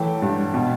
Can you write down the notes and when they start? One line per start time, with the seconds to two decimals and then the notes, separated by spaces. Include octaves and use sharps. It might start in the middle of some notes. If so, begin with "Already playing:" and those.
Already playing: E3 F#3 A3 G5
0.22 G2
0.54 B2